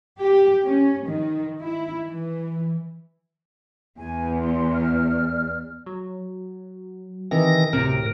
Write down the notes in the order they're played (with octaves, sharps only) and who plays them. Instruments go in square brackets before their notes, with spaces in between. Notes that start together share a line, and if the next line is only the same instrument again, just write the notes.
[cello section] G4
C#4
D#3
E4
E3
[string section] E2 [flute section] G#5
[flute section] C6
D5 F6
[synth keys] F#3
[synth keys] C3 [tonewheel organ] D#3 E3 A#6
[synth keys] D2 C3 C4 [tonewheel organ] A2 A#4